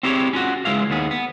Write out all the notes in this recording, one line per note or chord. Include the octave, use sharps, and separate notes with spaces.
C4 E4 G4 G#4 B4 C#5
C#4 F4 F#4
C#2 C3 G#3 E4 F5
D#2 B3 G#4
B3